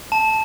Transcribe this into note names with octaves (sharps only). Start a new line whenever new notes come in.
A5